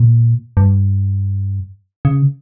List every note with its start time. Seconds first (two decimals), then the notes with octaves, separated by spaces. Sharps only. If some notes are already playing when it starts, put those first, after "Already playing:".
Already playing: A#2
0.57 G2
2.05 C#3